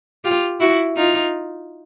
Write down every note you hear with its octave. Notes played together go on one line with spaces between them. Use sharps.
F4 G4
E4 F#4
D#4 F4